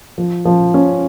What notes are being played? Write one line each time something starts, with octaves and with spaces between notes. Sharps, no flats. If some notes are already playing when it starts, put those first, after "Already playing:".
F3
F3
C#4